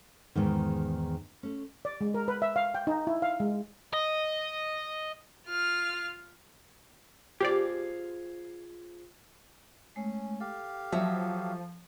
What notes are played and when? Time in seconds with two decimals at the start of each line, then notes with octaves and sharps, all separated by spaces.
0.35 E2 G#2 D#3
1.43 A3 C#4
1.85 D5
2.01 G#3
2.14 A#4
2.28 B4
2.42 E5
2.56 F5
2.75 G5
2.87 D#4
3.07 E4
3.22 F5
3.40 G#3
3.93 D#5
5.47 F4 F6
7.40 F4 G4 G#4 C5 D5
9.96 G#3 A3 C#4
10.40 G4 A4 F5
10.92 F3 F#3 E5